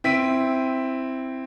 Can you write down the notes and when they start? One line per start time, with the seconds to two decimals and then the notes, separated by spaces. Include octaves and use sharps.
0.04 C4 E4 B6 D7 D#7